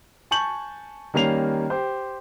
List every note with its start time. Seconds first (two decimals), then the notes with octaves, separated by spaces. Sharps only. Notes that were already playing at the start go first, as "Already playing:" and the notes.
0.31 G#5 A5 C#6 G6 F#7
1.14 D#3 G3 A#3 C#4 C7 F7
1.70 G4 C5